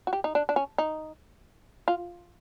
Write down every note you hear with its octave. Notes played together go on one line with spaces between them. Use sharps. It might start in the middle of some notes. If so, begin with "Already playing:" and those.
F#4
G4
D#4
D4
D4
C#4
D#4
F4